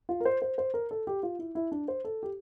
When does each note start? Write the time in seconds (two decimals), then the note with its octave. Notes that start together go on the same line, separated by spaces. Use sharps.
0.09 F4
0.20 A#4
0.25 C5
0.42 C5
0.58 C5
0.74 A#4
0.91 A4
1.07 G4
1.23 F4
1.39 E4
1.55 E4
1.72 D4
1.88 C5
2.05 A4
2.23 G4